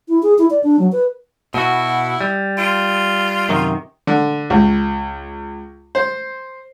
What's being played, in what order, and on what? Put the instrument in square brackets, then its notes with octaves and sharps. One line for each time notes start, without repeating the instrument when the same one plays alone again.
[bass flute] E4
G#4
E4
D5
D4
F#3
B4
[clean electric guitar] B2 F#4 [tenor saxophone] E4
[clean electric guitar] G3
[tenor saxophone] F4
[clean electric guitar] F#2 C3 D#3
[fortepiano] D3
C#2
C5